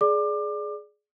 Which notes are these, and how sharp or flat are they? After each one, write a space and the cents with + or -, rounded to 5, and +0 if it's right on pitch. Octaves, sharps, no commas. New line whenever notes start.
G#4 +15 D5 +0 D6 +25